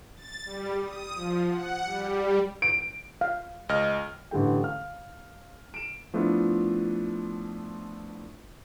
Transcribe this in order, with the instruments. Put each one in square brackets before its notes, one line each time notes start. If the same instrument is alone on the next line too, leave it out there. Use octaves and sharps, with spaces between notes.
[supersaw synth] A6
G3
D#6
F3
F#5
G3
[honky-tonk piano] D7
[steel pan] F5
[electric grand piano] C#2 D#5 F6
[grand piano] A1 D3 G3 A4 G5
F5 F6
D7 E7
[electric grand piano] F3 A3 B3 D4 E4 F4